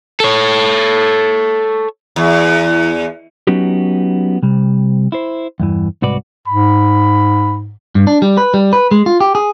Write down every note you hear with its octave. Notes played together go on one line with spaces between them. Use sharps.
A4 C#5
E2
F#3 B3 C#4 D#4 F#4 G4
C3 G3
E4 C5
E2 G2 E3
C2 G#2 F#4 B4 D5
G#2 B5
G2
D4
G3
B4
G3
B4
G#3
F4
G4
G#4